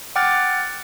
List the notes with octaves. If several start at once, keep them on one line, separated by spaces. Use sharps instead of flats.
F#5 G5 D6 F6 F#6 A6